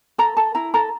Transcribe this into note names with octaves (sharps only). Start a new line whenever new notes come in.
A4 A#5
A4 A5
E4 A#5
A4 A#5